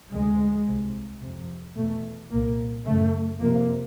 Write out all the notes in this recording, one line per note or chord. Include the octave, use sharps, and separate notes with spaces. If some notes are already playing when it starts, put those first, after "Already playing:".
D2 C3 G#3
C2 C3
F2 C3
E2 B2 A3
C2 A#2 A#3
F#2 C#3 A3
F2 C3 A#3